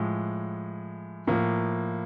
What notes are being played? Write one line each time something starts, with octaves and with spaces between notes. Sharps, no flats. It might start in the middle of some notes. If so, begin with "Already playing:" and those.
Already playing: A2 F3 G#3
A2 F3 A#3